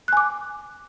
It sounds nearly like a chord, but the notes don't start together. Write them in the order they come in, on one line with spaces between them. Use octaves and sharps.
F#6 G#5 D6